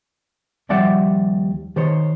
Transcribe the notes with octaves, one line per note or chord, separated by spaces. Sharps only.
D#2 F3 G3 D5 E5 F#5
D#3 C5 C#5